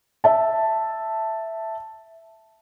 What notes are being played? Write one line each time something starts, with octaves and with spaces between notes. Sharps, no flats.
E5 A5